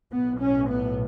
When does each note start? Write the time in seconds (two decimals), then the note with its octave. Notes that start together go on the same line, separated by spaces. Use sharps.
0.11 B1 A2 B3
0.40 C#4
0.68 B3